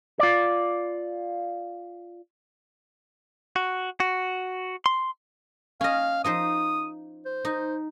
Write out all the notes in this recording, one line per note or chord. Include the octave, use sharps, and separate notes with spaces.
F4 D5
F#4
F#4
C6
C#4 D#5 F5
F3 D#4 C5 D#6
C5
D#4